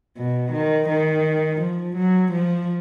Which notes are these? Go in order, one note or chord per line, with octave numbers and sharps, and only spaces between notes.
B2
D#3
D#3
F3
F#3
F3